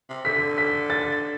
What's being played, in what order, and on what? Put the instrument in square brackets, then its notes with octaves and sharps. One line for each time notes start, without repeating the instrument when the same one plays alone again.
[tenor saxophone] C3
[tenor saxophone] D3 [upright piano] B6
[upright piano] B6
A6